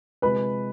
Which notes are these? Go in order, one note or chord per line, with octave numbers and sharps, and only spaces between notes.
C3 F3 G#3 B4 B5